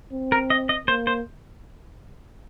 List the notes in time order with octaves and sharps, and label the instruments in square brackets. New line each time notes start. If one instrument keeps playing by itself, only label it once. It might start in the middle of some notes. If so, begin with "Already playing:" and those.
[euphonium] C4
[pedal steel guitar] A#4
D#5
D#5
[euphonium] A#3 [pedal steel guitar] C5
[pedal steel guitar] C5